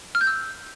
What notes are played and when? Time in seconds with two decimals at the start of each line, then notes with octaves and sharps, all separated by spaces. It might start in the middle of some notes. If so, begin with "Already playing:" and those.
0.15 F6
0.21 G6
0.27 E6